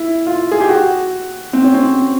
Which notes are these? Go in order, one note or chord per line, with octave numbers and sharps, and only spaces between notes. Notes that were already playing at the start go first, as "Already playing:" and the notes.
Already playing: E4
F4
G#4
G4
F#4
C4
C#4
C4